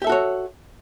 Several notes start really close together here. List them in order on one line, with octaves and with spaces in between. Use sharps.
G4 E5 A4 F#4 C#5